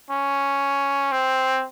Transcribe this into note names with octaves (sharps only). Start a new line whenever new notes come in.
C#4
C4